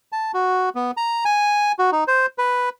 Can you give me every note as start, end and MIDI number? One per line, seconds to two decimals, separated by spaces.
0.12 0.32 81
0.34 0.69 66
0.75 0.91 59
0.97 1.24 82
1.25 1.72 80
1.79 1.90 66
1.92 2.04 63
2.08 2.26 72
2.38 2.69 71